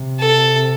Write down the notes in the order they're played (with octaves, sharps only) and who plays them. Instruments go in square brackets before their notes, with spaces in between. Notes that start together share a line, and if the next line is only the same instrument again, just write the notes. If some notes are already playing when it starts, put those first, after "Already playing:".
Already playing: [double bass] C3
[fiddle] A4